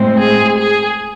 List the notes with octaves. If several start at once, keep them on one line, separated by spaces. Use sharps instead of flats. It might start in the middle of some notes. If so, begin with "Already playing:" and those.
Already playing: A2 G#3 C4
G#4
G#4